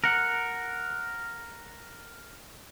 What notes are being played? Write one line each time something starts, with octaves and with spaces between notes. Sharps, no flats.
A#4 F#5